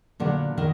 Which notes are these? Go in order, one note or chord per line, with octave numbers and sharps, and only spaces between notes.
A#2 D3 F#3 B3 D4
D#3 D#4